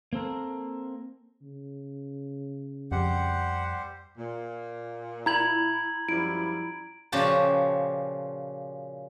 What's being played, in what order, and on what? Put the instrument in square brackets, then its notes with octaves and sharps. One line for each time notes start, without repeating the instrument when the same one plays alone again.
[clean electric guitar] A#3 C4 A4 A#4
[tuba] C#3
[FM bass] F2 [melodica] G3 G4 C5 [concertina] F#5
[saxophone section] A#2
[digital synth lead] E4 [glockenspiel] A#5 G#6 F#7
[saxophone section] F#2 F3 G3 [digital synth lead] E4 [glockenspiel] D7
[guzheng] A#2 C#3 F3 F#4 G4 A5